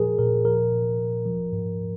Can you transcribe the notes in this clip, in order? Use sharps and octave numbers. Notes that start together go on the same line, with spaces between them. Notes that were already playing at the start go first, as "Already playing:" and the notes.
Already playing: A#2 F3 G#4 A#4
A#2 A#4
F3 A#4
A#2
A#2
F3
G#2